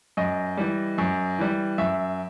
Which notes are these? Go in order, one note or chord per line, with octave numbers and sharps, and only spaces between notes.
F#2 D#5
E3 G3
F#2
E3 G3
F#2 E5